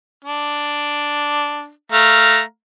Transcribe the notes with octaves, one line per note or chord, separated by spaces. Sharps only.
D4
A3 F5 A#5